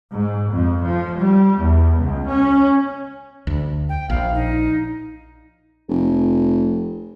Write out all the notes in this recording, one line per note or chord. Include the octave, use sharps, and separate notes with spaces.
G#2
F2
F3
G3
E2
C#2
C#4
D2
G5
A#1 F5
D#4
F1